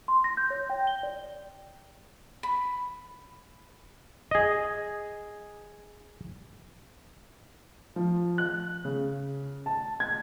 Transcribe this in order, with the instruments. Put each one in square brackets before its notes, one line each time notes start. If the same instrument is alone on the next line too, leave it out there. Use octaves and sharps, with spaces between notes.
[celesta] C6
A#6
G6
C#5
G5
G7
D5
[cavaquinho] B5
[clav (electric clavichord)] G#4 D#5
[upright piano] F3
F#6
C#3
A5
G#6